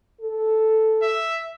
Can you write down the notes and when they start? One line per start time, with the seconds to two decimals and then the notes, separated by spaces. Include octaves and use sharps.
0.21 A4
1.02 E5